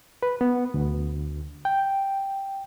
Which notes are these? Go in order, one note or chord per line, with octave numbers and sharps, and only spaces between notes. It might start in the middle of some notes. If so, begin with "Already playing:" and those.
B4
B3
D2
G5